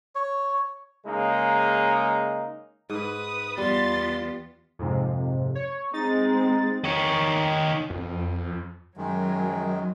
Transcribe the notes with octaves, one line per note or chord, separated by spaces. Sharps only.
C#5
C#3 G#3 A#3 D#4
G#2 B4 D#6
E2 G3 B3 F4 C6 A6
F2 G#2 C3
C#5
G#3 C4 D#4 A6
D#3 C#5
F2
F#2 D#3 F#3 G#3